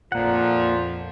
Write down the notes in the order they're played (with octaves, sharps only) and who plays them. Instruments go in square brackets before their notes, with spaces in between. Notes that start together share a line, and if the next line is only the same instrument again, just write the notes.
[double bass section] A#1 F2 [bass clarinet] A#2 [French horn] F3 [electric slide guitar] A#3 F#5